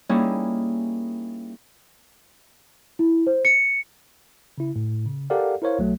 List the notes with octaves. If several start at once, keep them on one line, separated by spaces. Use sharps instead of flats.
G3 A#3 C#4 D#4 E4 G#4
E4
C5
C#7
C#3 E4
A2
C#3
G4 A4 A#4 D5 F5 F#5
E4 A#4 C5 C#5 F5
B1 F#3 A3